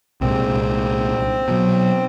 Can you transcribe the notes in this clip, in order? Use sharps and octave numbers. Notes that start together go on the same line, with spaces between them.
C2 A#2 G#3 C4
B2 F#3